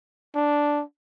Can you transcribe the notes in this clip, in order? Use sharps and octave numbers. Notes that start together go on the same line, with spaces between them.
D4